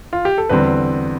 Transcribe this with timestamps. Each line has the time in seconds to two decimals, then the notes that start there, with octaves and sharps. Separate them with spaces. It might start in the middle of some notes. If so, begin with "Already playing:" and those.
0.13 F4
0.25 G4
0.38 A4
0.49 E2 D3 G3 C4 B4